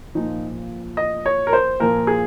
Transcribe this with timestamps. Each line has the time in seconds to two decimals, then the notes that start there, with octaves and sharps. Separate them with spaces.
0.15 A#2 F3 D#4
0.97 D#5
1.26 C#5
1.47 A#4
1.53 C5
1.80 A#2 F3 A#4
2.07 G#4